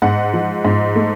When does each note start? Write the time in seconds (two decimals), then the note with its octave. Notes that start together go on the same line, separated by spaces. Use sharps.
0.02 G#2 F#5
0.34 F3
0.65 G#2
0.96 A3